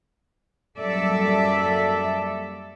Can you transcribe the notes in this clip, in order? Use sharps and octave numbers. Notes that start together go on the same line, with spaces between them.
F#2 G3 A#3 A4 D5 E5